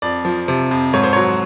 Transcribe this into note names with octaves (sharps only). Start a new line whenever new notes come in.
F2 D5
F3
C3
F2
G#2 C#5
C5
F#3 C#5